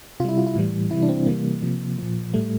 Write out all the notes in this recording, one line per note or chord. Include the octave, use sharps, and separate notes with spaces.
C3 G3 E4 F4
F4
E4
A2 E3 G3
C3 E3 G3 E4
D4
C4
C3 E3 G3 A#3
C3 F3
A#2 F3
A2 G3 A3